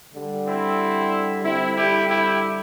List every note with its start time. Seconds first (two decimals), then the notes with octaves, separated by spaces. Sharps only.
0.13 D3 G3
0.46 C4 E4
1.42 D3 G3 C4 E4
1.75 E4 G4
2.07 E4 G4